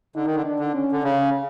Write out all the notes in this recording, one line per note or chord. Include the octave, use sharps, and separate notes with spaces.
D3 D#4
D#3
D3
D4
D3
C#4
D3
C#3 C#4